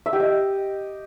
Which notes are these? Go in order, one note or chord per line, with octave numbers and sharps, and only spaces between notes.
E5
G4
D#5